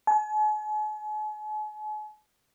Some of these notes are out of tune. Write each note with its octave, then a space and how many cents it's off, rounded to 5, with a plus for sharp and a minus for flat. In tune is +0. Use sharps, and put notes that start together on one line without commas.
G#5 +45